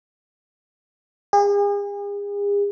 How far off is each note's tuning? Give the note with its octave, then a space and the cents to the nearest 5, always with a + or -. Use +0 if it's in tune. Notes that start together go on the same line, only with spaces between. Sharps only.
G#4 -40